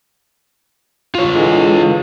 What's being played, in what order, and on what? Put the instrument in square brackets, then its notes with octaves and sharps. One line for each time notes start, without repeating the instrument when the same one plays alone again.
[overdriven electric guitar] F4 C#5
[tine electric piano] D3 E3 G#3